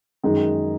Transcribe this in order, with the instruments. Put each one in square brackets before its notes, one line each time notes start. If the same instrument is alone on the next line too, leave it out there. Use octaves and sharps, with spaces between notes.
[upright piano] F#2 D#3 G#3 D#4 G#4